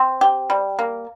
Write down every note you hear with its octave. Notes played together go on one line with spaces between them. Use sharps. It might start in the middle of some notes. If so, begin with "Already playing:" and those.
Already playing: C4
G4
G3
A#3